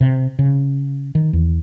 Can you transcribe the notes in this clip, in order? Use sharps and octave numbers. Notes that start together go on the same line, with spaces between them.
C3
C#3
D#3
E2